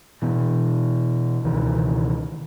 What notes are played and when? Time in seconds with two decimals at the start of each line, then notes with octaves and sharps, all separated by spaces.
0.22 B2 E3
1.44 C#2 B2 D#3 E3